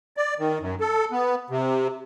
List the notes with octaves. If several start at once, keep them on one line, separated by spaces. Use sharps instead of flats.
D5
D#3
F#2
A4
B3
C3